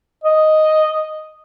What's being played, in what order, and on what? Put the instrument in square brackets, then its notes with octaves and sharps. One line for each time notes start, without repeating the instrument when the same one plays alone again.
[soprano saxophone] D#5